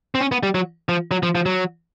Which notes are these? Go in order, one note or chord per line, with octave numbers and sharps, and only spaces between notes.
C4
C#4
B3
G3
F#3
F3
F#3
F3
F3
F#3